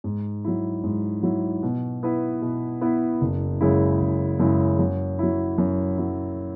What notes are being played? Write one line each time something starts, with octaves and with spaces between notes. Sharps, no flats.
G#2
F#3 E4
G#2
F#3 E4
B2
B3 E4 B4
B2
B3 E4 B4
F#1
F#2 C#3 G#3 E4
F#1
F#2 C#3 G#3 E4
F#2
F#3 E4
F#2
F#3 E4